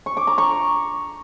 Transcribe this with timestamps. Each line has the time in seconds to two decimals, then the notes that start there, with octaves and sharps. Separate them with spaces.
0.06 C#6
0.17 D6
0.27 A#5
0.38 C#6